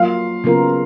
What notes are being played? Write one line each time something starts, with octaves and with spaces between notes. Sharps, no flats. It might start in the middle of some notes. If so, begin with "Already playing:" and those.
Already playing: F#3 A#3 F4 F5
C#3 F#3 B3 F4 A#4